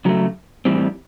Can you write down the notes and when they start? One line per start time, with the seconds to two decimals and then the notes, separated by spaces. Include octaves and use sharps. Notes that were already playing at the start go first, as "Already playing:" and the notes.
0.05 C#3 F#3 A3
0.65 A2 E3 G3 C4